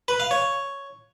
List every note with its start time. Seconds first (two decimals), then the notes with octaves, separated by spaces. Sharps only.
0.08 B4
0.20 F5
0.31 C#5